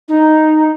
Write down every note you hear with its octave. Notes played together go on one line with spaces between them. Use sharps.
D#4